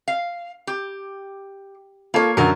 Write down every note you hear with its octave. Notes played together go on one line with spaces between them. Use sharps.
F5
G4
A#3 F4 A4 C#5
F#2 D3 F#3 A#4